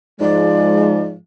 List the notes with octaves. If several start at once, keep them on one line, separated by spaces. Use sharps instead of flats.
G#2 F3 G#3 D5